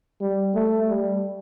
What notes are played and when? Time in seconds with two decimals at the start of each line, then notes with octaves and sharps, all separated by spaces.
0.21 G3
0.55 A3
0.89 G3